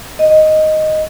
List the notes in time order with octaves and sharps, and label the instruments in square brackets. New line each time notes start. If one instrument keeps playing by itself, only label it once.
[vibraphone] D#5